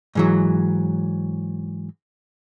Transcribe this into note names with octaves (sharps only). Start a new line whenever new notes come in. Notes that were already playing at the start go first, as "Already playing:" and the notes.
G#2 E3 F#3